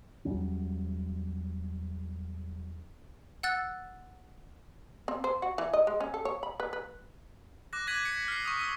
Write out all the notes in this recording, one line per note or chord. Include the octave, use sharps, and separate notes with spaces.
E2 F#3 G3 C#4
F#5 E6 F#6 A6
C4
C5
F#4
E3
D#5
G#3
C#4
A4
C#5
B5
B4
B4
D6 F#6 A#6
D6 F#6 G#6 B6 D#7 F#7
C#7
F6 C7
C#6 D#6
C#6 E6 B6